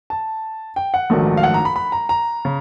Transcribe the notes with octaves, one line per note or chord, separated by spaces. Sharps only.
A5
G5
F#5
A#1 G#2 D#3 F#3 A3
F5
F#5
A#5
B5
B5
A#5
A#5
C#3